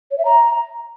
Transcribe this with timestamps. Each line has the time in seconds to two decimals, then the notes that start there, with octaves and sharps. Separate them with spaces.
0.11 C#5
0.18 E5
0.25 A#5